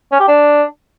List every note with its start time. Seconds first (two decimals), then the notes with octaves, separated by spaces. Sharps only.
0.12 C#4
0.20 G4
0.28 D4